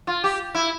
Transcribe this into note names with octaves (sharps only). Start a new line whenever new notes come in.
F4
G4
E4